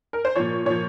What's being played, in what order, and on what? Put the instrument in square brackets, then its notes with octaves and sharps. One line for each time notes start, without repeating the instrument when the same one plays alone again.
[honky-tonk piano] A#4
C5
A#2 F3 C#5
A#2 F3 C#5